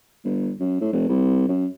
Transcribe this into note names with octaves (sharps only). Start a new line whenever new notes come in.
G1
F#2
A2
F1
C2
F#2